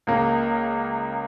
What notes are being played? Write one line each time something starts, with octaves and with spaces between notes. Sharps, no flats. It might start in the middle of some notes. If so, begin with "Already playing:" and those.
C#2 C#3 A#3